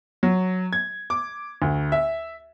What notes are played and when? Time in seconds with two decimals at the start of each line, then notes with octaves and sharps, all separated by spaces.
0.23 F#3
0.73 G#6
1.10 D6
1.62 D2
1.92 E5